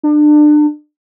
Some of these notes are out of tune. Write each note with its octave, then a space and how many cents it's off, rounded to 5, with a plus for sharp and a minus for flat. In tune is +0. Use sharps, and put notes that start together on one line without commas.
D4 +30